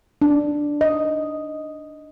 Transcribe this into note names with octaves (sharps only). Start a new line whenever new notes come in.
D4
D#5